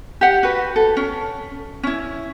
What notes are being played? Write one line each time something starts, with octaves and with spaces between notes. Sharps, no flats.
G4 F#5
F#4 B4
A4
C#4
C#4 E4